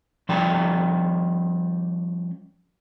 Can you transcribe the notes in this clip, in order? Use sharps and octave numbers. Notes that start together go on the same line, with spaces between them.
F3 G3 C#4 D5 G5 A#5